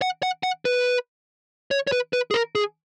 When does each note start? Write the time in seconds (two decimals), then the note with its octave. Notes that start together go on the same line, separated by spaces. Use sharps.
0.02 F#5
0.23 F#5
0.43 F#5
0.65 B4
1.71 C#5
1.87 C#5
1.92 B4
2.13 B4
2.31 G#4
2.34 A#4
2.55 G#4